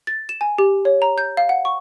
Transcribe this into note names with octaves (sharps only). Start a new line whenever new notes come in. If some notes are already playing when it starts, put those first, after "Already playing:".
A6
E7
G#5
G4
C#5
A#5
G6
F5
F#5
C#6